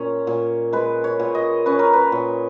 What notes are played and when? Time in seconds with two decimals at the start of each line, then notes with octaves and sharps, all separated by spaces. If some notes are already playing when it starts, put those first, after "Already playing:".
Already playing: A#2 C#4 C#5
0.27 A#2
0.73 G#3 B4
1.04 C#5
1.20 A#2
1.35 D#5
1.66 C#4 B4
1.79 A#4
1.93 B4
2.12 A#2